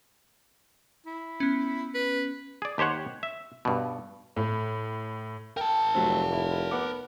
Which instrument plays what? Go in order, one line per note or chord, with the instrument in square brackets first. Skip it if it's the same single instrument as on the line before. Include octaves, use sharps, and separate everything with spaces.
[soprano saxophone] E4
[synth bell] B3 C#4
[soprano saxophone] B4
[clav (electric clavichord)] G#4 D5
D#2 G4 C5 C#5 F#5
E5
G2 B2
[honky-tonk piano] A2
[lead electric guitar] A#4 A5 [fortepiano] G5
[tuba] F1 [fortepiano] F#3 A3 C4
[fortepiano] E4
B3 F#5 D6